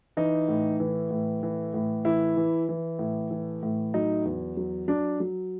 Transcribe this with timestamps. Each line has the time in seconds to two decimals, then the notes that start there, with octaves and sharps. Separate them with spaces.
0.17 E3 D#4
0.49 A2
0.80 E3
1.11 A2
1.43 E3
1.74 A2
2.05 E3 E4
2.37 E3
2.69 E3
2.99 A2
3.31 E3
3.63 A2
3.94 F#3 D#4
4.25 E2
4.57 F#3
4.88 F#3 D4
5.20 F#3